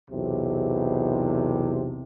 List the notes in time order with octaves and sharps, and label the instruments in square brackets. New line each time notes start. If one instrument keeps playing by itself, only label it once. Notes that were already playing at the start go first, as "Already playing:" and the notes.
[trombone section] B1 E2 C3